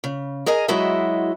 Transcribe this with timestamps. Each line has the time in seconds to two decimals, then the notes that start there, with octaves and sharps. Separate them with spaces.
0.04 C#3
0.46 G#4 A#4 D#5 G#5
0.68 F#3 G#3 E4 F#4 D#5 E5